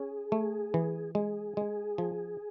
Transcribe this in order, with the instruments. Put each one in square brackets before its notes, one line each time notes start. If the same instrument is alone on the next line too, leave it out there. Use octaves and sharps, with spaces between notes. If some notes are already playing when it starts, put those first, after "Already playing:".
Already playing: [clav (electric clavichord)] C#4 [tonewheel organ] G#4
[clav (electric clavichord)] A3
E3
[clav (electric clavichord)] G#3 [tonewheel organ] G#4
[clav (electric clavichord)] G#3
F3